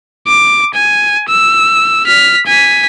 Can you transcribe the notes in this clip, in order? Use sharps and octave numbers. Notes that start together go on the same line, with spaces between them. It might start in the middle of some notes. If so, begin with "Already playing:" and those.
D6
G#5
E6
F6 B6
G#5 B6